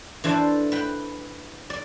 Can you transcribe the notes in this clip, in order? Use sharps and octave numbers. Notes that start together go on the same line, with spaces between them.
E3 D4 A4 C5 D5
B4 G5 B5
D5